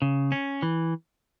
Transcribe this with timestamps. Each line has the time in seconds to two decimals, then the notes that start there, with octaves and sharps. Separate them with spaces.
0.02 C#3
0.32 C#4
0.62 E3